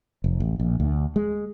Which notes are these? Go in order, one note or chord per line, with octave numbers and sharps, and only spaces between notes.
F1
A1
A#1
D2
G#3